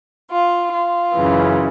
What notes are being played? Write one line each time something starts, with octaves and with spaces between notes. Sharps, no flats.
F4
F4
F#2 C#3 E3